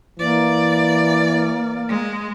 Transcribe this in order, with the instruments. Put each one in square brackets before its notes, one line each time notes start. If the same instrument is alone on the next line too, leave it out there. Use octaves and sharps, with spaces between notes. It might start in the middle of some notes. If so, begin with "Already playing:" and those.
[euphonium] E3 [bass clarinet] A#3 [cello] D5
[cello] G#3